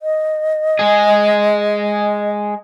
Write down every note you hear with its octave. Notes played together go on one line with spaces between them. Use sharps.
D#5
G#3 G#4